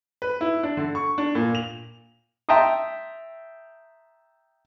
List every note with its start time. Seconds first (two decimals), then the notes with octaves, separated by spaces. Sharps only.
0.22 B4
0.41 E4
0.63 D4
0.77 D3
0.95 C#6
1.18 D4
1.35 A#2
1.55 F7
2.49 E5 G5 A5 A#5 C6 D#6